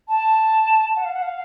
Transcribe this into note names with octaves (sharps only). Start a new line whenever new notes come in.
A5
F#5
F5
F#5
F5